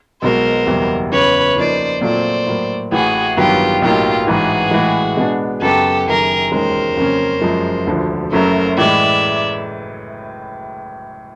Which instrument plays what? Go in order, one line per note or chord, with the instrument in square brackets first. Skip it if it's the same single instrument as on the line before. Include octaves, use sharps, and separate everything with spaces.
[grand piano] B1 B2 G#3 [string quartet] A#4 C5
[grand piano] F#1 E2 B2 G3
[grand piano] F#1 E2 C#3 [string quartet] B4 C#5
[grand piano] C#3 F3 A#3 D#4 [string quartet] C5 D5
[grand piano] A#2 F#3 A3 C4 F4 [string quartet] C5 D5
[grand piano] A2 F#3 A#3
[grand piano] A1 A2 E3 [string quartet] F#4 G#4
[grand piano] A1 G2 D#3 F#3 B3 [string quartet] F4 G4
[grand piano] B1 A2 F#3 A#3 D#4 [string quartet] F4 G4
[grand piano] A1 G#2 E3 [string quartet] F#4 G#4
[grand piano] A2 E3 G#3
B2 G#3 B3 D4
[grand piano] F#2 C#3 F#3 B3 [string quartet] G4 A4
[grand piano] F#1 F#2 D#3 F#3 [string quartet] G#4 A#4
[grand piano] E1 D#2 D#3 G#3 C#4 [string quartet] A#4 C5
[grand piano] F2 C#3 F#3 A#3 C#4
F#1 F#2 C#3 F3 G#3
E1 D2 D3 F3
[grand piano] F#1 F#2 C#3 F#3 A3 [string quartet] A#4 C5
[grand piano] A2 E3 G#3 [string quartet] D5 E5